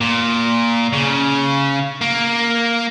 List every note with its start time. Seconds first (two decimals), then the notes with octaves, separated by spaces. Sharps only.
0.01 A#2
0.93 C#3
2.01 A#3